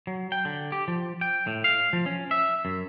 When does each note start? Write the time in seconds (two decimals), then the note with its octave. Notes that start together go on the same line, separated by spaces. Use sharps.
0.07 F#3
0.32 G5
0.45 D3
0.72 G4
0.88 F3
1.21 G5
1.47 A2
1.64 F5
1.93 F3
2.06 C#4
2.31 E5
2.65 F#2